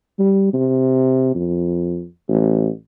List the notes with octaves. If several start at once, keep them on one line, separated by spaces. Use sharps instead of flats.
G3
C3
F2
A1